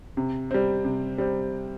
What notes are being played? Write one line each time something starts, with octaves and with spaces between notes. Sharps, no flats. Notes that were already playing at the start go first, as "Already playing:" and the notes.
C3
G3 C4
C3
G3 C4